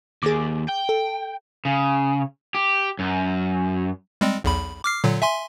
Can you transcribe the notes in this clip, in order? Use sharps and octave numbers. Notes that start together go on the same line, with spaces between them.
D#2 G#4 D6
G5
A4
C#3
G4
F#2
G3 G#3 C4
B1 E2 B5
D6 F6 C7
A#2 D3 F#3
E5 G#5 C6